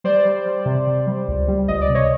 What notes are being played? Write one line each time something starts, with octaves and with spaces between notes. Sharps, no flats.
G3 C5 D5
G3
G3
C3
C3
G3
C#2
G3
C#2 D#5
D5
C3
C#5 D#5